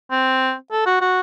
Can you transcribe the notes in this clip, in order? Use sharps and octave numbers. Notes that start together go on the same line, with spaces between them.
C4
A4
F#4
F#4